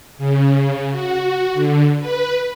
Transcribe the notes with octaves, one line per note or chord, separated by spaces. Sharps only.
C#3
F#4
D3
B4